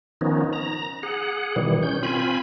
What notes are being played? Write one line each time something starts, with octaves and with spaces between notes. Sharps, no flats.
D#3 F3 B3 C#4 D#4
A#5
G#4 F#5
B2 D#3 E3 G3
C#4 G6
C4 F4 G#5 B5